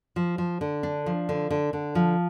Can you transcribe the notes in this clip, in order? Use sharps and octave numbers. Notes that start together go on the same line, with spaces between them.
F3
F3
D3
D4
F3
D3
D3
D3
F3